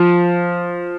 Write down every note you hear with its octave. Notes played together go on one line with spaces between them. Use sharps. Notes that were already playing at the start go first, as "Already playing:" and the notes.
Already playing: F3